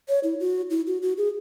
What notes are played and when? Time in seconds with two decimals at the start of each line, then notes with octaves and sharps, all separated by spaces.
0.08 C#5
0.23 E4
0.40 F#4
0.70 E4
0.87 F#4
1.02 F#4
1.18 G#4